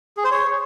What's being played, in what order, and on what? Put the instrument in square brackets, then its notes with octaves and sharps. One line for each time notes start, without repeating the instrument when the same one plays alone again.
[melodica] G#4
C5
C#5